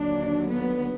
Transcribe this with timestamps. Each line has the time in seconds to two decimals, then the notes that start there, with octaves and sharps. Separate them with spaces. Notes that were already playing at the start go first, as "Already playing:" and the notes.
Already playing: D#2 D3 F#3 D4
0.52 B3